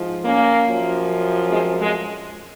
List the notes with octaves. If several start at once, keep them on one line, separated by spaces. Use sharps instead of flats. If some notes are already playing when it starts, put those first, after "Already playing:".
Already playing: G#2 F3
A#3 C#4
F#2 F3
G#3 C4
G#3